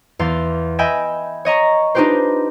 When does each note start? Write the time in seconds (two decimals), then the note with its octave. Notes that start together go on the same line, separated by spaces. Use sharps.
0.19 E2 F5 C6 A6
0.79 D#5 E5 G5 G#5 B5
1.45 C#5 D#5 A#5 C#6
1.95 D4 D#4 F4 G4 B4 C5